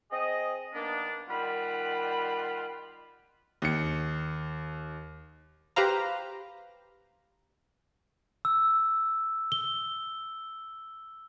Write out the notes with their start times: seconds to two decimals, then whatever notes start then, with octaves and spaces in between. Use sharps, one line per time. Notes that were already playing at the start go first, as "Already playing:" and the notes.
0.11 C4 G#4 D#5
0.74 D#3 A#3 B3 D4
1.29 D#3 G3 F4 F#5 B5
3.62 D#2 C#7
5.76 G4 B4 C5 F5 A#5
8.45 E6
9.52 G7